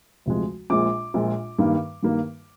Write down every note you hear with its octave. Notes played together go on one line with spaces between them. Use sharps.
D2 C3 F3 G#3
A#1 A#2 G#3 D6
A#1 A#2 G#3
G2 D#3 A#3
G2 D#3 A#3